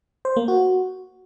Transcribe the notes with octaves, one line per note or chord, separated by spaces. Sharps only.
C5
A#3
F#4